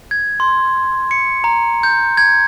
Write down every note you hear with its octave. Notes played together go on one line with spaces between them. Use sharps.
G#6
C6
C#7
A#5
G6
G#6